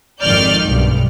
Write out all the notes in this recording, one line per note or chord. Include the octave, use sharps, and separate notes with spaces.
G#1 F2 D#3 D5 F6 G6
B1 G2